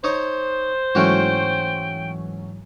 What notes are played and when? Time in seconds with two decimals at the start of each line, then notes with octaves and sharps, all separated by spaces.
0.04 D#4 C5 C#5 D#6
0.95 G#2 E3 F#3 A3 C#4 F#4 G5